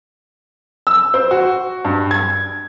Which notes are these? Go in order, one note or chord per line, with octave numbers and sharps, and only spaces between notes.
E6
C5
F#4
G2
G#6